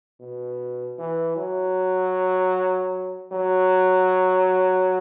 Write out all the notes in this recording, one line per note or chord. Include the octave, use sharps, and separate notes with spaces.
B2
E3
F#3
F#3